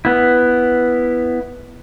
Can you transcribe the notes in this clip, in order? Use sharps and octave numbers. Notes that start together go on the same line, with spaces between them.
B3 E4